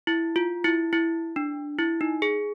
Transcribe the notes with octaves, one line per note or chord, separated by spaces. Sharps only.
E4
F4
E4
E4
D4
E4
D#4
G#4